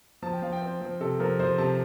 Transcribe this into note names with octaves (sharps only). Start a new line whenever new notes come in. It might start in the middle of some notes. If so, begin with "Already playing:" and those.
F3 A5
G5
F3 F5
G5
C4
F3
C3 A4
F3 A#4
F3 C5
C3 A5